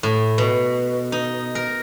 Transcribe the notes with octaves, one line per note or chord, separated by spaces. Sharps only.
A2
B2
D#4
A#4